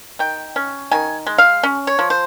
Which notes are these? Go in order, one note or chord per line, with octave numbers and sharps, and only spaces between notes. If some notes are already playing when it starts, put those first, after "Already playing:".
D#3 G5
C#4
D#3 G#5
G#3
F5
C#4
C#5
F3
C5